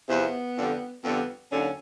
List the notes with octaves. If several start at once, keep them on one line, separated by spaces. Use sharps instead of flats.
E2 C3 F3 B3
F2 D3 G3
F2 D3 G3 B3
D#2 D3 F#3 C#4